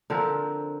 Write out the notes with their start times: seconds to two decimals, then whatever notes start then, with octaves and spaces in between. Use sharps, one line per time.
0.10 D3 F3 C4 A#4